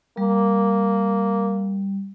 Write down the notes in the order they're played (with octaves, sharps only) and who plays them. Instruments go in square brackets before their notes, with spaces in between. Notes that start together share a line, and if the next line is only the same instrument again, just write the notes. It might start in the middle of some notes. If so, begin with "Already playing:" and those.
[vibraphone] G3 [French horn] A#3